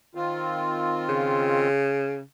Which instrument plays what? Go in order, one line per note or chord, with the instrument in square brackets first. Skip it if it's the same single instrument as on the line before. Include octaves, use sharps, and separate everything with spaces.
[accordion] D#3 C4 F4
[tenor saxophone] C#3